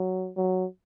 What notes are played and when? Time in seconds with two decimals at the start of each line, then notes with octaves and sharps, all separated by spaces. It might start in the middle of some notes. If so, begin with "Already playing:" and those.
Already playing: F#3
0.37 F#3